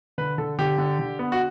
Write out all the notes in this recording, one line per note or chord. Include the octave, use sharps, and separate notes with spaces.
D3 B4
D3 A4
D3 G4
D3
D3
B3
F#4